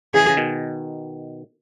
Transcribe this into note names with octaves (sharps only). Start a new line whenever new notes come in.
C#3 E3 G#4
C#3
B2 D#3